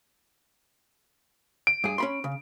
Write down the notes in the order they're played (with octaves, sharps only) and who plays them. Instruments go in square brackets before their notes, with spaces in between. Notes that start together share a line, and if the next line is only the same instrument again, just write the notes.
[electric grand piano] D7
[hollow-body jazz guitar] G2 G#4
C#4 B5 C6
C#3